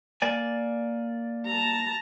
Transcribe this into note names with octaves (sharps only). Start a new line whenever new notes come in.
A#3 D5 G#5
A5 A#5